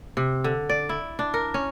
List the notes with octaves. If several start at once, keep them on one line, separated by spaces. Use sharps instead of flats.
C3
D3
D5
E4
D4
A#4
C#4